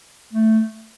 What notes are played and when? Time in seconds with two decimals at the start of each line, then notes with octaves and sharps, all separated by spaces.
0.33 A3